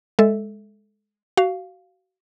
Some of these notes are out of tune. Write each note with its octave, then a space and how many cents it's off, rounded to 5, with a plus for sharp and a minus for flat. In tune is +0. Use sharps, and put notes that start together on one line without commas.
G#3 +0 A4 +0 E5 +0
F#4 +25 F5 +0